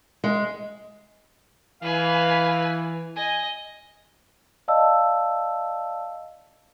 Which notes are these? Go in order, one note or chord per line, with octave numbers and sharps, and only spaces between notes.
G#3
E3 B4 F5 G#5
D#5 G#5
D5 D#5 F5 A5 E6